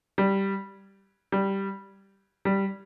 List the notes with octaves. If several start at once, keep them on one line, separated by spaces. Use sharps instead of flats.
G3
G3
G3